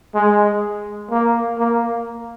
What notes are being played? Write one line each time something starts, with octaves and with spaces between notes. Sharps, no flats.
G#3
A#3
A#3